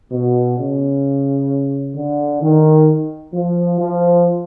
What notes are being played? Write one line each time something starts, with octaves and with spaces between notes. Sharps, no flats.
B2
C#3
D3
D#3
F3
F3